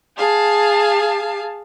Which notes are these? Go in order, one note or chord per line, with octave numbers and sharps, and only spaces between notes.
G#4 F5 A5